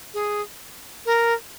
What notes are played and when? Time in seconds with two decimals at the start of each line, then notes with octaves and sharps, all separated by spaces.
0.14 G#4
1.05 A#4